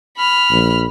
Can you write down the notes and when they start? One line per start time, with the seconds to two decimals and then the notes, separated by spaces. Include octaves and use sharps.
0.17 B5 F6
0.52 A#1